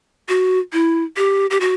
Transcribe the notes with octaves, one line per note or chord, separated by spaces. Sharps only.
F#4
E4
G4
G4
F#4